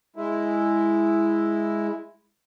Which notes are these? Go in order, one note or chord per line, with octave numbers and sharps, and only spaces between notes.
G#3 E4